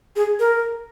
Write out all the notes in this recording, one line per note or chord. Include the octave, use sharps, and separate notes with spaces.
G#4
A#4